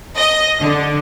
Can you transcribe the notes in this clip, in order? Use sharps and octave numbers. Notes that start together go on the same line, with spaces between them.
D#5
D3